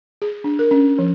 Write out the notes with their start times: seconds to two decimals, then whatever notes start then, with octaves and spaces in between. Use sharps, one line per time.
0.22 G#4
0.44 D4
0.59 A#4
0.71 C#4
0.99 F3